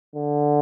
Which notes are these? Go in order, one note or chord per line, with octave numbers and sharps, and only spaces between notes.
D3